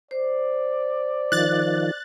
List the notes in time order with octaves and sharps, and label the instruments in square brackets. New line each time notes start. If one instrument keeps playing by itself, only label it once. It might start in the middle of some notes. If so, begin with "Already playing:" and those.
[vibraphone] C5 [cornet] D5
[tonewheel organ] D#3 F3 [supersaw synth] F#6 A6